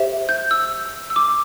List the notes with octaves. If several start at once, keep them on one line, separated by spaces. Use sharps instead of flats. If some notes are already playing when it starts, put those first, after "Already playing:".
Already playing: G4 C5 E5
G6
E6
E6
D6